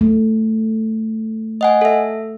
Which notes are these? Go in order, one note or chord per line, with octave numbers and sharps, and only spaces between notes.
A3
D#5 F#5 G#5
A4 E5